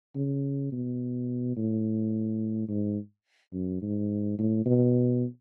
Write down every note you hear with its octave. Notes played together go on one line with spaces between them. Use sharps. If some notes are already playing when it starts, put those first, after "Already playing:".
C#3
B2
A2
G#2
F#2
G#2
A2
B2